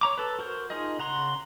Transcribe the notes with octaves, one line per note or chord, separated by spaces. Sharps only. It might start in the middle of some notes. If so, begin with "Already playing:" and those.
C#5 A#5 D6
A4 B4
F#4 A#4 C5
D#4 F4 G#4 A#4 D#5
C#3 F#5 A#5 C6